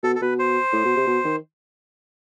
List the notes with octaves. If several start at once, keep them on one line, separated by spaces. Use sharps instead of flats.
B2 A4
A4
B2 B4
C5
A2
B2
C3
B2
D#3